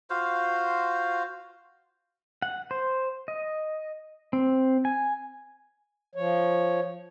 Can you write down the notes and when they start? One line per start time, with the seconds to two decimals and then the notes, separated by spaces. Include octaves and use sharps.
0.10 F4 F#4 C5 F5
2.42 F#5
2.71 C5
3.28 D#5
4.33 C4
4.85 G#5
6.15 F3 C#5